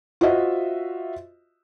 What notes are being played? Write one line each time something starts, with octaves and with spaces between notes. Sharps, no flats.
F4 F#4 C5 D#5 E5